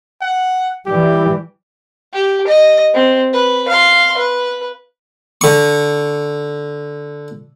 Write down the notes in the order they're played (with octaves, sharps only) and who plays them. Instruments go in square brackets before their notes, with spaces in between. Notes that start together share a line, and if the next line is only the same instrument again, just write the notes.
[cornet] F#5
[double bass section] E3 G3 [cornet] G4
[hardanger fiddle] G4
D#5
C4
B4
F5 C6
B4
[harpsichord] D3 C#6